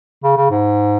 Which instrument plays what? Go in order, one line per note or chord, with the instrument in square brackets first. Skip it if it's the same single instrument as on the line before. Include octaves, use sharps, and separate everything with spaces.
[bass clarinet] C#3
C#3
G#2